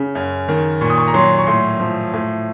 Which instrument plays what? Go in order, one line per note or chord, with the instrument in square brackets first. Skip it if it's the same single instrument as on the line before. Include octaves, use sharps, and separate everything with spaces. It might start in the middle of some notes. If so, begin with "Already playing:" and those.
Already playing: [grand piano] C#3
F#2
D#3
A#2 C#6
D#6
C#6
A#5
F#3 C6
C#6
A2 C6
F3
A2